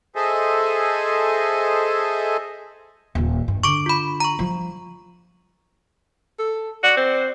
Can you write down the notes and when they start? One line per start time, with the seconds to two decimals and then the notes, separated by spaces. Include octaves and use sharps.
0.16 G#4 A4 C5 D#5 E5 G#5
3.15 D#1 A#2
3.48 G2
3.63 D3 C#6 D6 D7
3.86 F4 B5
4.20 A#5 C#6
4.39 F3 G3
6.39 A4
6.84 F#4 D5
6.97 C4